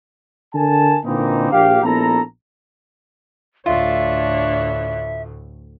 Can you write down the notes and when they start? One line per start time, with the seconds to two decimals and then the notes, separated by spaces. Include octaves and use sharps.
0.54 D3 A#4 G#5 A5
1.05 A#2 D3 E3 A#3 C4 D#4
1.52 A#1 G4 F5
1.83 A#1 B3 E4 A4 A#5
3.66 D2 A2 D4 F4 C#5 E5